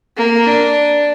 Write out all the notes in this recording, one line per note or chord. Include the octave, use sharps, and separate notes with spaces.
A#3
D4